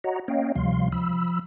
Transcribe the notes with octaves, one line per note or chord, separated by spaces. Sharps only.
F#4 C#5 D#5 F#5 A#5
A#3 C#4 C#5 D#5 F5 G5
D2 C3 F3 G3 F5 C6
F3 B5 E6